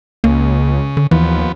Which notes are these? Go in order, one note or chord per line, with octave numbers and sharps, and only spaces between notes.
C#2 C#3 A#3
D3
D#2 E3 F3 B3